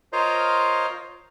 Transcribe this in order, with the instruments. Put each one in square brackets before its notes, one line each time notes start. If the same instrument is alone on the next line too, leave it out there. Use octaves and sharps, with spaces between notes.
[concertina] F4 A#4 C5 C#5 D#5 F5